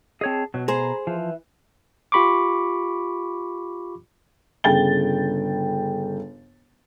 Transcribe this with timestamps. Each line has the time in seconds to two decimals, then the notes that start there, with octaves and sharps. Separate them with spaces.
0.21 C4 G#4 C#5 D#5 A5
0.54 B2 F#3
0.68 G#4 C5 A#5 B5
1.07 E3 F3
2.12 F4 G4 B5 C#6 D6
4.64 G1 C#3 G5 A6 G7